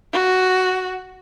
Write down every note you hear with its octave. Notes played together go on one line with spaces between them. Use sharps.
F#4